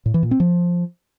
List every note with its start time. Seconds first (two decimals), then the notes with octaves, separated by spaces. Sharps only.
0.06 A2
0.14 E3
0.23 A#2
0.31 C4
0.40 F3